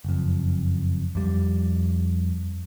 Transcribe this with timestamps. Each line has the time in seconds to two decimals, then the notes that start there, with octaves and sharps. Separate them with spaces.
0.05 F#1 F2
1.15 F2 G3